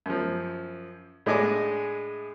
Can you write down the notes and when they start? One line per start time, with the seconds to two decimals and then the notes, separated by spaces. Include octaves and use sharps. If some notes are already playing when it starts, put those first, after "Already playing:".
0.06 F#2 F3
1.26 A2 G#3 D4 D#5 G#5 D6